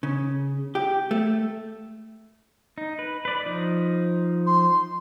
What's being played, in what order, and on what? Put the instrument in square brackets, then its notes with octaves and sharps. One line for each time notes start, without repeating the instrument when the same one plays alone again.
[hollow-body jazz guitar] C#3
G4
A3
[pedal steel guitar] D#4
B4
B4 D5
F3 D#4
[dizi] C6